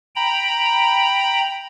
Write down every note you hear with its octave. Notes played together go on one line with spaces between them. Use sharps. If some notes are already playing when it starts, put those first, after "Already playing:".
G5 A#5 B5